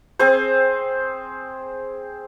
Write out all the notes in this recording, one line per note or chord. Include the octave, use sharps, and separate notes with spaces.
C4 G#4 C5